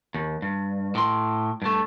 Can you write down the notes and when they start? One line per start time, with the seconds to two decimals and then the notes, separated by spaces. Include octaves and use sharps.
0.14 D#2
0.42 G2
0.95 A2 C6
1.62 G2 A3